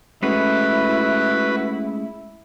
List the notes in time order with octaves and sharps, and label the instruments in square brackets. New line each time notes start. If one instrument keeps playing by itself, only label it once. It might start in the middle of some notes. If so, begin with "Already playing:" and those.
[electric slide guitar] G#3 A3 C#4 [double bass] E4 [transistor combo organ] F#4 B4